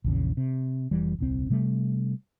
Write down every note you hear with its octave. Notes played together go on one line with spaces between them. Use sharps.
A#1 E2 C#3
C3
F1 E3 G3
D#1 C2 C4
C3 G3 A3